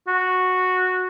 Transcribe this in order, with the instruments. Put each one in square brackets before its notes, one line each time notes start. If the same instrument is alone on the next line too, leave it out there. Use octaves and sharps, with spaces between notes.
[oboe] F#4